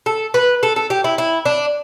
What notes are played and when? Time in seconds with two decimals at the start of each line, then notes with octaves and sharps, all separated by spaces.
0.06 A4
0.34 B4
0.63 A4
0.76 A4
0.90 G4
1.04 E4
1.18 E4
1.46 D4